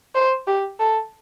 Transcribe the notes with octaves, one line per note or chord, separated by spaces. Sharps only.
C5
G4
A4